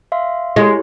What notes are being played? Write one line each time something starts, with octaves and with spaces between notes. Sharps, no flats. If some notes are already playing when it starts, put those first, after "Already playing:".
E5 F5 C6
G#3 E4 G4 C#5